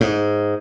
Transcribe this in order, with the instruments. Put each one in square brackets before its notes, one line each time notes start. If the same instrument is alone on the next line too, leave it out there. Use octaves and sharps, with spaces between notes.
[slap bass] G#2